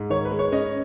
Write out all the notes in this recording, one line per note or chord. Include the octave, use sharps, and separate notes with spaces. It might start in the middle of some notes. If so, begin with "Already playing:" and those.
Already playing: G#2
D#3 C#5
B4
G#3
C#5
C#4 D#5